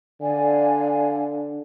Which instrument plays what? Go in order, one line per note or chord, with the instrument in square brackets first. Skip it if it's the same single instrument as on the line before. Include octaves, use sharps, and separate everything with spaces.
[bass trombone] D3 [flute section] D5 F5 G#5